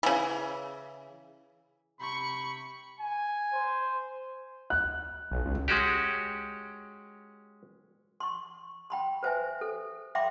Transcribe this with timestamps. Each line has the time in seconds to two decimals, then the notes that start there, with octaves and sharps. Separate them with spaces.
0.03 C#3 E3
2.00 C3 B5 C#6 C#7
3.01 G#5
3.54 C5
4.70 F#6
5.31 B1
5.45 C#2
5.68 G#3 C#4 F#4 G4
8.20 C6 C#6
8.90 G5 B5 C6
9.23 B4 C5 E5 G#5
9.61 A4
10.15 E5 G5 B5 C6 D6